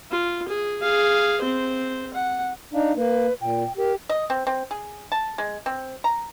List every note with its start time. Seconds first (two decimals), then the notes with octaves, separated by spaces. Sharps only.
0.11 F4
0.48 G#4
0.82 G#4 F5
1.41 C4 C5
2.14 F#5
2.73 D4 D#4 F5
2.96 A#3 B4
3.41 A#2 G5
3.77 G4 A#4
4.09 D#5
4.30 C4
4.47 C4
4.71 G#4
5.12 A5
5.38 G#3
5.66 C4
6.04 A#5